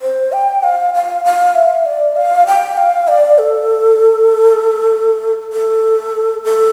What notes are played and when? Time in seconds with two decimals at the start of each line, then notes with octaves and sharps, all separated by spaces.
0.02 C5
0.32 G5
0.63 F5
0.94 F5
1.25 F5
1.55 E5
1.86 D5
2.16 F5
2.47 G5
2.77 F5
3.08 D5
3.38 A4
5.53 A4
6.45 A4